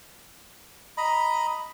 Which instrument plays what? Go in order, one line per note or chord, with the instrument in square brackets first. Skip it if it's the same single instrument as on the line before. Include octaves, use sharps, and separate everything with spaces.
[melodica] D#5 A#5 B5